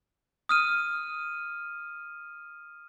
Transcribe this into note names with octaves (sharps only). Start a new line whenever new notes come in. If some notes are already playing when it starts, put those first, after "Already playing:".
D#6 F6 D#7